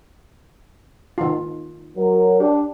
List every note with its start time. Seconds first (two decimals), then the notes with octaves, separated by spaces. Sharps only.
1.18 D#3 F4
1.96 F#3 A#4
2.40 D4 G4